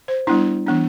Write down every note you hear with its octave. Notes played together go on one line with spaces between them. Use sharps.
C5
G3 B3 D4 E4
E3 B3 D4